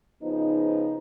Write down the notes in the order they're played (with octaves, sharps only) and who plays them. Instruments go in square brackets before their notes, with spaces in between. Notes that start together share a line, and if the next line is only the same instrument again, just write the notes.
[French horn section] C#3 F3 B3 D#4